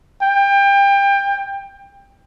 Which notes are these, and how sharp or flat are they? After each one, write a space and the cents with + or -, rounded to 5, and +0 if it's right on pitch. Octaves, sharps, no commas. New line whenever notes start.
G5 +25